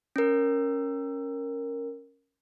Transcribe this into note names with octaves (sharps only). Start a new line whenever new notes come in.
C#4 A#4